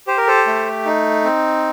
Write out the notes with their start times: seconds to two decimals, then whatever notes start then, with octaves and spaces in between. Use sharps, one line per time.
0.07 G4 C5
0.18 A#4
0.27 A4 C5
0.47 A3
0.85 D#4
1.24 C4